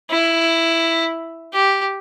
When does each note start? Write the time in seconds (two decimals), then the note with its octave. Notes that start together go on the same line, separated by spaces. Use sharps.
0.10 E4
1.53 G4